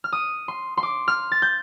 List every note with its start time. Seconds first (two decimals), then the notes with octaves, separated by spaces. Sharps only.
0.04 F6
0.12 D#6
0.48 C6
0.77 C6
0.83 D6
1.08 F6
1.32 A6
1.42 G6